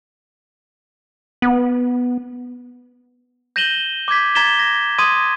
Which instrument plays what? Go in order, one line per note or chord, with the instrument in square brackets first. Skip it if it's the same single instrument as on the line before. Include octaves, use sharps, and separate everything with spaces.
[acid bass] B3
[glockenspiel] G6 A#6 D#7 E7 F#7 G7
D6 G6 G#6 B6
A#5 G#6 A6 B6 E7 G7
A#6
C6 D#6 G#6 D#7